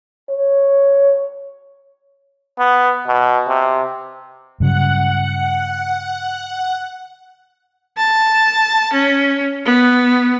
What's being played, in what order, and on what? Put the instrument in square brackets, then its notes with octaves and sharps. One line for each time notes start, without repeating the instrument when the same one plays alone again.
[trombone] C#5
B3
B2
C3
[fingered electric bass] G2 C#3 F#3 [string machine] F#5
[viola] A5
C#4
B3